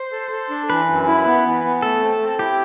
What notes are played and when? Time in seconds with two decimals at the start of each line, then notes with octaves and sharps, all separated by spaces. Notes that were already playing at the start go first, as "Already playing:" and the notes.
Already playing: C5
0.12 A4
0.31 A4
0.50 D4
0.69 E3 B4
0.89 F#2
1.07 E4
1.26 B3
1.45 E3
1.64 B3
1.82 A3 A4
2.02 C4
2.20 C4
2.39 E4 G4